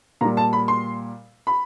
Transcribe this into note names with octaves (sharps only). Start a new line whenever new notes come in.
A#2 G3 A#5
A5
B5
C6
B5